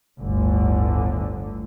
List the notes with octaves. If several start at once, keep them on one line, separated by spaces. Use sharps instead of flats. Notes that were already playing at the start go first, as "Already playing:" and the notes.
G1 D2 A2 D3